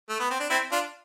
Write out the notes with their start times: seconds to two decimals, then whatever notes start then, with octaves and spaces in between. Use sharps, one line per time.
0.09 A3
0.20 B3
0.30 C4
0.40 D4
0.50 C4 E4
0.72 D4 F4